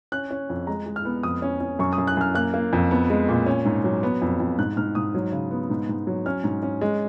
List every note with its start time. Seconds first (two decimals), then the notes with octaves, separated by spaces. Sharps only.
0.12 C#4 F#6
0.31 C#4
0.50 F2
0.67 G#3 A#5
0.86 G#3
0.96 F6
1.05 B3
1.23 F2 D#6
1.42 C#4
1.60 C#4
1.79 F#2 C#6
1.93 D#6
1.98 F#2
2.07 F#6
2.17 F#2 F6
2.35 A#3 F#6
2.54 A#3
2.73 F2
2.91 B3
3.10 G#3
3.29 A#2
3.46 C#4
3.65 G#2
3.84 F#3
4.03 B3
4.22 F2
4.40 F2
4.59 G#2 F#6
4.77 G#2 F6
4.95 G#2 D#6
5.15 F#3
5.32 C#3
5.51 B3
5.70 G#2
5.89 G#2
6.07 F#3
6.26 C#4 F6
6.44 G#2
6.63 C#4
6.81 G#3